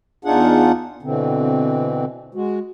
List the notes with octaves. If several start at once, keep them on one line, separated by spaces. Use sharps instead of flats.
E2 D4 D#4 F4 G#4 F#5
B2 D3 E3 C4
G#3 F#4